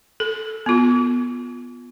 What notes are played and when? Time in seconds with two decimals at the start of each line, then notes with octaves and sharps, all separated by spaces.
0.20 A4
0.66 B3 F4